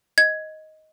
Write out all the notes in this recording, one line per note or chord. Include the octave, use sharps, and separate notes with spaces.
D#5 G#6